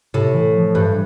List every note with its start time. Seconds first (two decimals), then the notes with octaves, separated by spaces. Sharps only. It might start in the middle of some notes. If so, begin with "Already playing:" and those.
0.14 A2 C3
0.34 E3
0.55 F3
0.74 G2 E3